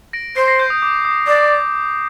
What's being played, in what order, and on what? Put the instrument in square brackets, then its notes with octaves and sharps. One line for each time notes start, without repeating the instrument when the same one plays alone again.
[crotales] A#6 D7
[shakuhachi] C5 [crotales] C7
[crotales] A#6
G6
D#6
D6
D#6
[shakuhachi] D5 [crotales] D6
[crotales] D6